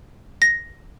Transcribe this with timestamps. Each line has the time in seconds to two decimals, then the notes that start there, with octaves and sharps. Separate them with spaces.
0.42 A#6